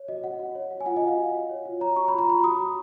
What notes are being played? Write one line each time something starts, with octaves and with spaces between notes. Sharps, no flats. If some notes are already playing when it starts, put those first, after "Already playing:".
Already playing: C#5
F#4 D#5
F#4 F#5
F#4
C#5
F#4
G#5
F4 F#5
D#5
F4
F5
F#4
F#4
C#5
F4
C#5 A#5
F#4 C#6
F4 B5
A#5
F4 B5
F#4 D#6
F#4